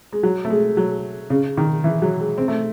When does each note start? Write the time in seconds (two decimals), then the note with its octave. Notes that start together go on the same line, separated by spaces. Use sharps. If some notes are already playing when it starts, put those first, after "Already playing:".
0.13 G#3
0.23 F#3
0.45 A3
0.50 G#3
0.77 F#3
1.30 C#3
1.57 D#3
1.84 E3
2.02 F#3
2.20 G#3
2.38 C4
2.48 A3